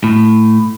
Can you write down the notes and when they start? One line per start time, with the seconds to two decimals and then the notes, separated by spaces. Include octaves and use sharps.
0.04 A2